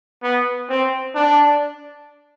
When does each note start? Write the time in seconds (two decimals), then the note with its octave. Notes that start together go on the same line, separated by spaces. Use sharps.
0.23 B3
0.69 C4
1.15 D4